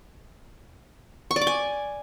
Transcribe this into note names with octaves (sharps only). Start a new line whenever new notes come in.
C#6
D5
D6
G#5